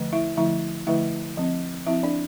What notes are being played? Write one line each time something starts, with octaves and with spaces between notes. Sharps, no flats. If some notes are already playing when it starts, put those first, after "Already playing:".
Already playing: D3 F3 A3
E4 E5
D3 F3 A3 E4 E5
D3 F3 A3 E4 E5
F3 C4
F3 C4 E4 E5
D4 D5